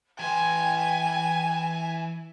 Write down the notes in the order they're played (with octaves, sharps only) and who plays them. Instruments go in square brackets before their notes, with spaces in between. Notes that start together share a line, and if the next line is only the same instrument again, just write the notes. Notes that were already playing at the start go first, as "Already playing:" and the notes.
[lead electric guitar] E3 C6 [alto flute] G5 [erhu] G#5